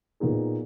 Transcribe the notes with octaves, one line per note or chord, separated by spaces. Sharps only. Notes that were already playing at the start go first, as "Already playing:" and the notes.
A#2 F#3 B3 D#4 G#4